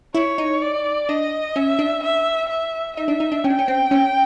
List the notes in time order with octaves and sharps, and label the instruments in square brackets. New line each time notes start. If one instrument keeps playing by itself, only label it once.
[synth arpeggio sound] E4 [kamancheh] C#5
[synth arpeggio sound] D#4
[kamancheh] D5
[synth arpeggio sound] D4 [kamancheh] D#5
[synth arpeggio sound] C#4 [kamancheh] E5
[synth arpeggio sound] D4
[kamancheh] E5
E5
[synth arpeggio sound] D#4 [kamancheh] E5
[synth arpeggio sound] D4
D#4
D4
[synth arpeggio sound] C#4 [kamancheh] G5
[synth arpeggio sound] D4
C#4
C4
C#4